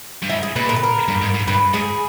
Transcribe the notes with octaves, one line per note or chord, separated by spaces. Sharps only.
G2
G#2 E4
G#4
A#2 B4
A#4
B4
A#4
G2
G#2
G#2
G2 B4
G#2 G#4